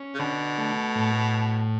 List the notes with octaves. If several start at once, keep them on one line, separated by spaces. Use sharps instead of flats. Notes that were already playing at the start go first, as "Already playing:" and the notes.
Already playing: C#4
C#3
B2 D3
A3
A2